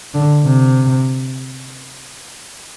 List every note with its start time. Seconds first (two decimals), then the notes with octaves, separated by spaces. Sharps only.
0.14 D3
0.45 C3